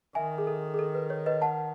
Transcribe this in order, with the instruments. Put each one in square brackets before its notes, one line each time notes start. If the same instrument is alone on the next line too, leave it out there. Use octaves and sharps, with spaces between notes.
[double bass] D#3 [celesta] E5 G#5
[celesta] G#4
A4
G#4
A4
B4
C#5
B4 D#5
F#5 A5